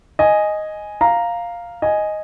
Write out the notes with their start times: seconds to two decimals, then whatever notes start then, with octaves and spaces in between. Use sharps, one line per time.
0.19 D#5 G#5
1.01 F5 A#5
1.82 D#5 G#5